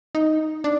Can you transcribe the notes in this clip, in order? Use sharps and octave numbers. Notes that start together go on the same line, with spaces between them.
D#4
D4